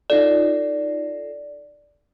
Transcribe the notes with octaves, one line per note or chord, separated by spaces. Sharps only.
D#4 F4 A4 D5